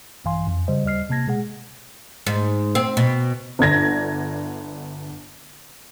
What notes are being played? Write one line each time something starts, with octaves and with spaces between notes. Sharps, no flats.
A#1 G2 E3 F5 G#5 C6
F2
C#3 G3 C5 D#5
D#2 G3 D#5 F6 C7
C3 A#3 A5 G#6 A#6
B2 G#3 G#4 F#5
G#2
C4
B2
G1 D3 G#6 A#6